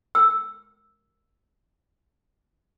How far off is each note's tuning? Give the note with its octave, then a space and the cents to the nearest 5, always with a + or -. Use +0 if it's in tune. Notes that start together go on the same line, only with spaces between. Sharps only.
E6 +0